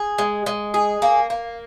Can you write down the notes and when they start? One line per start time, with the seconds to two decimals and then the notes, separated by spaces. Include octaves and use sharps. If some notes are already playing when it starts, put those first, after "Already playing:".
Already playing: G#4
0.18 G#3
0.46 G#3
0.74 G#4
1.02 A#3
1.30 A#3